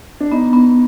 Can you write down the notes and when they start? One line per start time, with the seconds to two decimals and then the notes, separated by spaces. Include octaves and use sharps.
0.20 D4
0.32 B3 D#4
0.53 B3